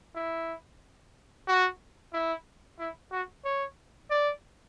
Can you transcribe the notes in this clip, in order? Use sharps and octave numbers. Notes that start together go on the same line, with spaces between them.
E4
F#4
E4
E4
F#4
C#5
D5